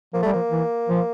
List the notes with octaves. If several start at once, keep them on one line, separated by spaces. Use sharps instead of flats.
F3 A#3
G3 A3
F3 A#3
E3
F3